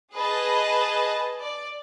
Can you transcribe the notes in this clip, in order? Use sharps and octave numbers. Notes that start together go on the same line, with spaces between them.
G#4 B4 D#5 A5
D5